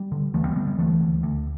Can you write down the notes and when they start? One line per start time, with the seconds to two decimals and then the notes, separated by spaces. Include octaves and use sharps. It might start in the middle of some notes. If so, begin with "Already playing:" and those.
Already playing: G3
0.12 D3
0.34 D2 E3 A3
0.45 G3 B3
0.56 D3 G3 B3
0.68 G3 B3
0.78 D2 E3 A3
1.01 D2
1.23 D2